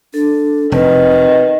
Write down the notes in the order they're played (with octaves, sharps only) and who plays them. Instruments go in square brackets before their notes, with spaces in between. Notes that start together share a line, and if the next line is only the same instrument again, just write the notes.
[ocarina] D4 [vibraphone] A4
[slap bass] F1 [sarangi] D#3 [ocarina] C4 [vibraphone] B4